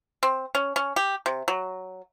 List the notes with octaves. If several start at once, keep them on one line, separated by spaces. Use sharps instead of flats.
C4
C#4
C#4
G4
C3
F#3